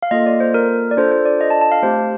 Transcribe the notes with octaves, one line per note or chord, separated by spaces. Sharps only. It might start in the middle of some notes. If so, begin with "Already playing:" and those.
F5
A#3 F4 A4 D#5
D5
C5
A#4
D5
D4 F4 A4 C5
C5
D5
D#5
A5
A5
F5
A3 C4 G4 C5